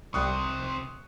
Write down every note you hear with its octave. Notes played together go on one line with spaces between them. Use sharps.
C2 C3 F3 G3 C#6 D#6 F#6